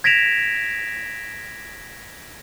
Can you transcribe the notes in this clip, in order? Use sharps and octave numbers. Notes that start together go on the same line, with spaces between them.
G#6 A#6 B6 D7 E7 F7